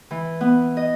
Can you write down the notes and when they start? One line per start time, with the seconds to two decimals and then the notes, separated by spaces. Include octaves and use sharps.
0.11 E3
0.41 B3
0.77 D#5